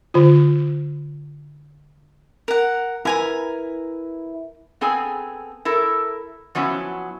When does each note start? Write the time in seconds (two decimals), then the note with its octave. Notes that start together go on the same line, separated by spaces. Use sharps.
0.14 D3 F4
2.48 A#4 F#5
3.05 E4 A#4 B4 G#5 A#5
4.81 B3 C4 G#4 A4 G#5
5.65 E4 A4 A#4
6.55 F3 F#3 B3 C#4 E4